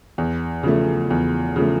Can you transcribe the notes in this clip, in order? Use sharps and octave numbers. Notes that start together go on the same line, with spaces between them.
E2
C#3 F3 A3
E2
C#3 F3 A3